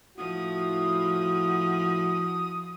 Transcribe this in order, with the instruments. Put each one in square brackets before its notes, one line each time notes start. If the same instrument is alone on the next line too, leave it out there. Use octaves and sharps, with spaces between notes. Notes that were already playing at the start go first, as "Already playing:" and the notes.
[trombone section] A2 E4 F#4 [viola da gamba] F3 [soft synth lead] D#6